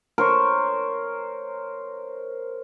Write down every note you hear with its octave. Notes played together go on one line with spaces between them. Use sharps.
A#4 C5 C#5